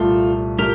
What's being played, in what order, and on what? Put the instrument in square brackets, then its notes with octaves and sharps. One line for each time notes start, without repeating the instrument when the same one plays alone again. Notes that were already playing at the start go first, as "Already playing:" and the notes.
Already playing: [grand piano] C2 A#2 A3 [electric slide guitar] F4 A4
[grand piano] A#2 A3 [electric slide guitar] G4 A#4